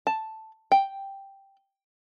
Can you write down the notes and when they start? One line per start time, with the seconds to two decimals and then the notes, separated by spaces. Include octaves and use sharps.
0.07 A5
0.72 G5